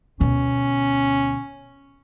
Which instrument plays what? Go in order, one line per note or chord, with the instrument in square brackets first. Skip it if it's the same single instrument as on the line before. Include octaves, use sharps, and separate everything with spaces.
[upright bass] D2 B2 [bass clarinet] C#4